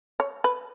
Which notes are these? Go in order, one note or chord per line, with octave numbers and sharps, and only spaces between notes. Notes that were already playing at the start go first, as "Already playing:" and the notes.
C#5
B4